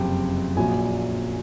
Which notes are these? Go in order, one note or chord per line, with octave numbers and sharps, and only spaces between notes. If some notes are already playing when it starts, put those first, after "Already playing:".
Already playing: F#1 F2 C3 G5
A#1 A#2 F#3 G#5